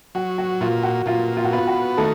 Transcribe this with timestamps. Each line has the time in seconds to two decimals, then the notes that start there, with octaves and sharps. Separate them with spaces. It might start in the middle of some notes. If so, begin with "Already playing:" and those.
0.15 F#3 F#4
0.38 F#4
0.61 A#2 F4
0.83 F#4
1.06 A#2 F4
1.37 F4
1.45 F#4
1.53 B3 F4
1.68 F#4
1.97 D#3 A3 A4